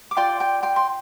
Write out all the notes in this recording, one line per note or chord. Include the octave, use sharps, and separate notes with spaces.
D6
F4 D5 G5 C6
G5 C6
G5 C6
C6